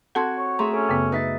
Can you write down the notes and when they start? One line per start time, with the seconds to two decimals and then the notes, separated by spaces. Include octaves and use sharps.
0.15 C4 F#4 A4 F#5 A5 C6 G#6
0.38 C#5
0.59 A3 G#4 E5 A#5 C6
0.74 C#4 A4
0.89 F#2 C#3 B3
1.12 D#4 B4 E5 A6